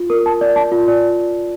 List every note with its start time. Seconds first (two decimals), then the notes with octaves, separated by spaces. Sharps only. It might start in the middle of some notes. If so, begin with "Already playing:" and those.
Already playing: F4
0.10 A#4
0.26 A5
0.41 D5
0.56 A5
0.72 F4
0.88 D5